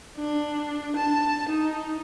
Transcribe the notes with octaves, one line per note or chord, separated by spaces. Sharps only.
D4
A5
D#4